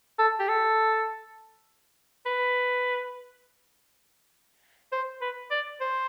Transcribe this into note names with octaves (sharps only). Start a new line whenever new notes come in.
A4
G4
A4
B4
C5
B4
D5
C5